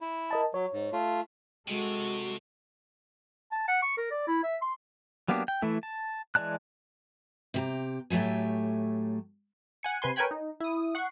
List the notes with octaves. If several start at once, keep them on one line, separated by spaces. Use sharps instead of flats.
E4
A#4 D#5 A5
F#3 C#5
G#2
A3 F4
C3 G#3 F#4 A4
A5
F#5
C#6
A#4
D5
E4
E5
C6
F#3 A#3 B3 D4 G4
G5
E3 A3 E4
A5
E3 G#3 D5 A5 F#6
C3 G4 A#5
A2 F#3 A3 G4 G#5
F#5 G#5 C#7
C3 B4 G#5 C6
A#4 B4 C#5 G5 G#5 B5
D#4
E4 D#6
F#5 C#6 C7